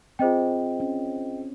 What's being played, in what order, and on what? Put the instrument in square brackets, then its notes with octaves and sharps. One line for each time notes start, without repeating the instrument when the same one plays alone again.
[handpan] C4 [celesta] F4 G#4 C5 D#5 G5
[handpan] C#4